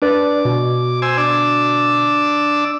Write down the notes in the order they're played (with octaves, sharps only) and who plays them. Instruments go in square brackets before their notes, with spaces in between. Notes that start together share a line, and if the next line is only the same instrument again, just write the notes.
[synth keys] D4 B4 D5 [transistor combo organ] D6
[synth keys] B2
[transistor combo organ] C5 G#5 E6
D4 D5 E6